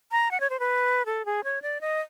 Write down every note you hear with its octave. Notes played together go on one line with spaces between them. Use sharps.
A#5
F#5
C#5
C5
B4
A4
G#4
C#5
D5
D#5